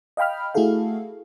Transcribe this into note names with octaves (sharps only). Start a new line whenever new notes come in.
D#5 F5 G5 B5 F6
A3 E4 F#4 G#4 A4 F5